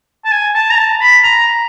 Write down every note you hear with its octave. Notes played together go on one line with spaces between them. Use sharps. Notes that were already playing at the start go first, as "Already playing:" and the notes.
A5
G#5
A5
A#5
A5
B5
A#5